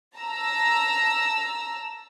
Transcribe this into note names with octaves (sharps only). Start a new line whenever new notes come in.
A5 A#5 E6